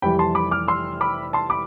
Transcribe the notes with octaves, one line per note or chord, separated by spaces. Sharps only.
F1 F2 C3 E3 G3 G5 B5
A5 C6
B5 D6
D6 F6
C6 E6
B5 D6
A5 C6
B5 D6